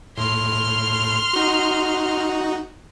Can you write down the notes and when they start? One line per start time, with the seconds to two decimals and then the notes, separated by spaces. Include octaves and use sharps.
0.18 A2 C6 F6
1.33 D#4 F#4